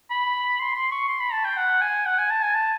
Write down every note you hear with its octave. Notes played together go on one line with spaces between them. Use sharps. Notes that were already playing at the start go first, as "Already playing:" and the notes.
B5
C6
C6
C#6
C6
B5
A5
G5
F#5
G#5
F#5
G#5
A5
G#5
A5